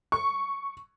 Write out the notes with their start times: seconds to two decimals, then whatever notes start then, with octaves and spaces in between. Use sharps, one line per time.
0.12 C#6